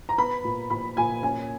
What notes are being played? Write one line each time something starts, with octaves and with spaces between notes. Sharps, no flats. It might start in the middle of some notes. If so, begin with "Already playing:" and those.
A#5
B3 B5
A#2
A#2 B5
A#2 G#5
C#4 G#5